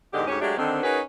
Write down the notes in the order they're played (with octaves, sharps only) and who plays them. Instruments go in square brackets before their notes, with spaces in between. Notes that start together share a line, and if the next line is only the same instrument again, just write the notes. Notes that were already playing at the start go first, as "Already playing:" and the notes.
[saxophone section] E2 G#2 D3 G#3 G4 D#5
D2 G#2 C#4 G4 C#5
F#3 G#3 A3 D4 G4
D3 D#3 C4
C#4 D#4 F#4 G#4 A#4 B4